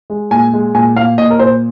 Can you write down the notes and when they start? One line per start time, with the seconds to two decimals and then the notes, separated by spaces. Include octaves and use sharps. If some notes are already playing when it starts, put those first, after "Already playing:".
0.10 G#3
0.31 A#2 G#5
0.54 G#3
0.75 A#2 G#5
0.96 A#2 F5
1.18 A#2 D#5
1.31 A#4
1.39 A#2 C5